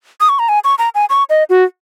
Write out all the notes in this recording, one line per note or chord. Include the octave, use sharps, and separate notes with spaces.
D#6
C#6
A#5
G#5
C#6
A#5
G#5
C#6
D#5
F#4